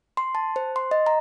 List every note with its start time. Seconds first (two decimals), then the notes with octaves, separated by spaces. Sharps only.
0.17 C6
0.35 A5
0.56 C5
0.76 C6
0.91 D#5
1.07 A#5